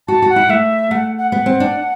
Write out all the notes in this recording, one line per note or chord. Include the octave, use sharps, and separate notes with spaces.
F#4 A5
F#4
F#5
E4
A3 E5
A3 F#5
F#5
B3 F#5
C4
D4